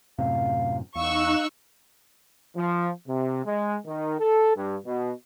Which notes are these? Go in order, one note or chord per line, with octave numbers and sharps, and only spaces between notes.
F#2 A2 C3 F5
E2 D#4 F5 C#6 E6 F#6
F3
C3
G#3
D#3
A4
G2
B2